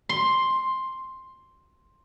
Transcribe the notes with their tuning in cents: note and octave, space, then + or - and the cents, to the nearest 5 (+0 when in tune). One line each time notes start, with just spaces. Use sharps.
C6 +5